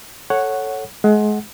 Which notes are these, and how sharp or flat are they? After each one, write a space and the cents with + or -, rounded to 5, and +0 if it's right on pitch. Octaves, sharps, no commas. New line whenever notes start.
A4 +0 C#5 -5 F#5 +0
G#3 +30 F#5 +0